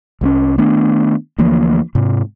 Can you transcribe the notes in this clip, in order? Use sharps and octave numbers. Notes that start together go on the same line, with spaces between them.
C2 G#3 C#4
D#3 A3 B3 D4
D2 E3 F3 A#3
G#2 C3